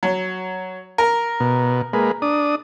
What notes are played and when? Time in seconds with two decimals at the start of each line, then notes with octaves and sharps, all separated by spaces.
0.03 F#3
0.98 A#4
1.40 B2
1.93 G#3 A#3 B4
2.22 D4 D#6